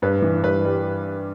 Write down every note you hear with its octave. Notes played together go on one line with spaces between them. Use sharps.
G2 B4
E3
G2 B4
G3